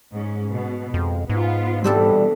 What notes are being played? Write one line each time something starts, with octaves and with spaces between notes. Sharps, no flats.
G#2 C#4
B2
F2 G#3
G#2 B3 F4
B2 E3 G3 C4 D4 A4